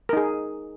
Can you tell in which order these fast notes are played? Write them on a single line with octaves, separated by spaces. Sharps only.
A#4 D#4 G#4